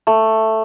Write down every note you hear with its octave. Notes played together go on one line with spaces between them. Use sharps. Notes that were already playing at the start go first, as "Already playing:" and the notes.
A3